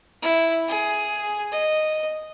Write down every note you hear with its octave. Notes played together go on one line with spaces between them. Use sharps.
E4
G#4
D#5